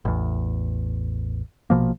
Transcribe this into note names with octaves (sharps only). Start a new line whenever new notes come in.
A1 E2
A#1 B2 F3 A#3